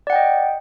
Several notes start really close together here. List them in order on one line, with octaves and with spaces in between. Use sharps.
D5 F#5 G5 D#5